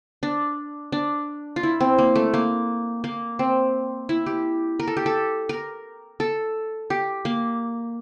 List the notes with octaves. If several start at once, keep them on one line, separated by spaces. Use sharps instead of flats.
D4
D4
F4
E4
C4
A#3
A3
A#3
A#3
C4
E4
G4
A#4
A4
G4
A4
A#4
A4
G4
A#3